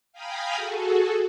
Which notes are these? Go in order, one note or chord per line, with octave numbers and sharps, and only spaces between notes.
F5 G5 G#5 A#5 B5 D#6
F#4 G#4 A4